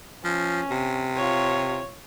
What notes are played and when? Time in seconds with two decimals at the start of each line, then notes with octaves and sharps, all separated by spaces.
0.25 F3 C#4
0.70 C3
1.16 F4 C#5